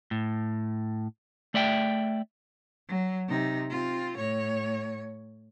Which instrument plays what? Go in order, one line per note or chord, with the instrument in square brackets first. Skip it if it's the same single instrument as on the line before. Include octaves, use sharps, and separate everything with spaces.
[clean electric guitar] A2
A3 D5 E5 G5
[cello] F#3
C3 D#4
C4 F4
A2 C#5